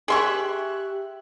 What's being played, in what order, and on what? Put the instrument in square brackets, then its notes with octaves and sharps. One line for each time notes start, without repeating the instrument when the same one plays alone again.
[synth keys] G4 E5 F#6 [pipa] G#4 C6 C#6